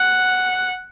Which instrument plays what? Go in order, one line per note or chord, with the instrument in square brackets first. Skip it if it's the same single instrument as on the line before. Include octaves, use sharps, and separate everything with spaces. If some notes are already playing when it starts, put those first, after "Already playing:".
Already playing: [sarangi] F#5